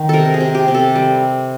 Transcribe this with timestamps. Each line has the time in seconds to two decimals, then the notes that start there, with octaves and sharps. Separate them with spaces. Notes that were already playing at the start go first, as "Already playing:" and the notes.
Already playing: D#3
0.09 C3 A4 A#4
0.34 G#4
0.41 C3
0.55 G4
0.68 C3
0.74 A4
0.95 G3